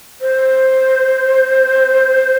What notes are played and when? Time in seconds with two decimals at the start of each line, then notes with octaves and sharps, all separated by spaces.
0.21 C5